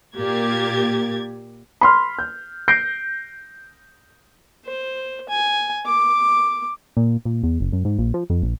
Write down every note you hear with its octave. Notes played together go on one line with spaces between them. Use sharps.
A#2 A#3 G4 G#6 A6
B5 C6 F6
G6
G6 A#6 C7 D7
C5
G#5
D6
A#2
A#2
E2
F#1
F#2
G#2
A#1
F3
F2
A#1